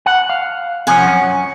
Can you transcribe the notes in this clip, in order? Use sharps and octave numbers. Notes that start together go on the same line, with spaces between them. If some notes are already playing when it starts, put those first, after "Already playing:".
F#5
F5
C3 F3 C#4 F#5 G#5
F#2 C#4